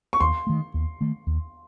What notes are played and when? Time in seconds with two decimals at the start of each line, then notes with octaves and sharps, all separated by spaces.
0.13 C#6
0.20 D#2 C6
0.47 D#3 A3
0.74 D#2
1.01 D#3 A3
1.27 D#2